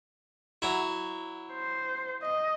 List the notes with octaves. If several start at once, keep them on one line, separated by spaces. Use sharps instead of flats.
F#3 E4
C5
D#5